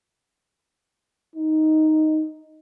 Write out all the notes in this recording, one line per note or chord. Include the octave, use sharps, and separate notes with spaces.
D#4